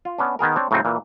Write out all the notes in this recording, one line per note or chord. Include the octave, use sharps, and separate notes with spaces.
F4
B3 C#4 D4
D#3 B3 G#4 A#4
C4 D4 C#5
A2 C#3 F#3 C4 D#4
A#2 E3